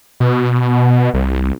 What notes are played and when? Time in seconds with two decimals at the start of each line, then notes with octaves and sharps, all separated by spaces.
0.20 B2
1.14 C2